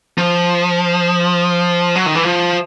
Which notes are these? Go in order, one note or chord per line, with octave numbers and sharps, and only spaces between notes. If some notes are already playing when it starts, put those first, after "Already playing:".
F3
F#3
D#3
E3
F3